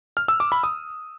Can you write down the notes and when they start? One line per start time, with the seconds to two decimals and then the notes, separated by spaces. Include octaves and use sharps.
0.17 F6
0.28 E6
0.40 D6
0.52 B5
0.63 D#6